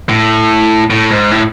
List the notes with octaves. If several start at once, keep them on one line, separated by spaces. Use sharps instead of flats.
A2
A2
G#2
A2